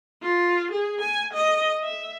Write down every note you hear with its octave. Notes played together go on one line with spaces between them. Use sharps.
F4
G#4
G#5
D#5
E5